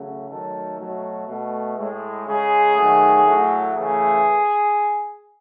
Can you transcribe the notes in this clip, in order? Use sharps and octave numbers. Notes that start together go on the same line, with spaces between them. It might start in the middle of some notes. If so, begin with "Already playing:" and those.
Already playing: C#3 F#3 A3
D#3 F#3 A3 A4
B2 F#3 A3
B2 A3
A2 G#3
C#3 G#3 G#4
D#3 F#3 A3
A2 F#3 A3
C#3 E3 A3 G#4